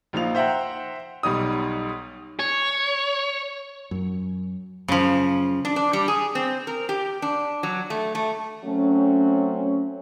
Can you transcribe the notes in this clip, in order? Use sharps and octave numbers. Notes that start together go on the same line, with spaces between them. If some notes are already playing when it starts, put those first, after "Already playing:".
A#1 F3 D#4 F4 F5 F7
C5 E5 F#5 G5 A#5
B1 G3 D#4 C#5 D#6
C#5
F#2
F#2 C#3 F3
D4
D4
G3
G#4
C4
A#4
G4
D4
F#3
A3
A3
F#3 A3 C4 C#4